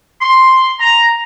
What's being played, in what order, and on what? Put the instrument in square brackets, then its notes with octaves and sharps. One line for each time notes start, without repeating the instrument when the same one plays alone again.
[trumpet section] C6
A#5